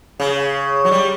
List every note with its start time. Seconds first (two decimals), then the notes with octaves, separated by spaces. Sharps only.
0.20 C#3
0.85 F#3
0.91 G3